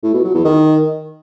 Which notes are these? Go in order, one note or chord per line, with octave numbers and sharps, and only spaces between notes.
A2
B2
F#3
E2
D#3